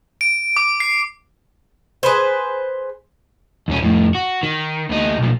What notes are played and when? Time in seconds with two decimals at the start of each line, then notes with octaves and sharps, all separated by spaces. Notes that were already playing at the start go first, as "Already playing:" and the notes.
0.21 D7
0.57 D6
0.80 C7
2.03 G#4 B4 C5
3.68 D#2 C#4
3.83 F2 A2
4.15 F#4
4.43 D#3
4.90 D2 D#4
5.19 B1 A#2